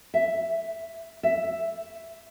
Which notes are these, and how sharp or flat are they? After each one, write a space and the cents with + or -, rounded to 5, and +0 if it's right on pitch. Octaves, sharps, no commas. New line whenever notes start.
E5 +5
E5 +5